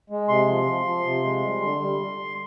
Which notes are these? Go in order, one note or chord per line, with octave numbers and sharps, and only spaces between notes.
G#3
C3 C6
F3
F3
F3
C3
G#3
G3
D3
G3